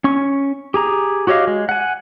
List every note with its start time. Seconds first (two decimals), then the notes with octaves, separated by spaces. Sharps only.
0.04 C#4 C#6
0.74 G4 G#4 A#5
1.27 F#4 G4 C#5 D#5 F5
1.47 G#3
1.69 F#5 G#5